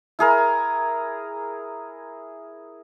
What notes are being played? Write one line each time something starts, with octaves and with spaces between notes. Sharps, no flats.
E4 G#4 A#4